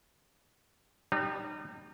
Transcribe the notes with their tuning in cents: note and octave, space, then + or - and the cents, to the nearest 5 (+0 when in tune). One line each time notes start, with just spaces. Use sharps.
G3 +0 D#4 -35